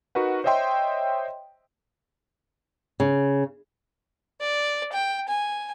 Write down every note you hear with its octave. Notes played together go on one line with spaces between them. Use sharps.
D#4 F#4 A#4 B4 F#5
C5 C#5 D#5 E5 G5 C6
C#3
D5
G5
G#5